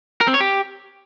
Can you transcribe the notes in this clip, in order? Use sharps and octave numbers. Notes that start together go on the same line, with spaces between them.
A#4
C4
C#5
G4